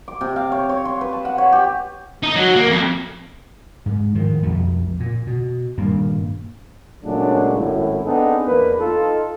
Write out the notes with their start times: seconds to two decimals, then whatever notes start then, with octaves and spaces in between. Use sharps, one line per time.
0.08 D6
0.21 C3
0.36 F5
0.52 C#5
0.69 C#5
0.85 C6
1.01 B4
1.13 A5
1.25 F#5
1.38 C#5
1.52 G4
2.23 D#4
2.36 F#3
2.56 A#3
2.69 F2
3.86 G#2
4.15 A2 D#3 F3
4.43 B1 F2 F3 A3
5.00 A#2
5.27 B2
5.78 D#1 G2 A#3
7.03 A#2 C#3 F#3 G#3 A3 D4
7.56 G#1 F#2 A2 E4
8.04 B3 C4 D4 D#4 G#4 A4
8.46 E2 A2 A#3 D4 B4
8.80 D#4 F4 A4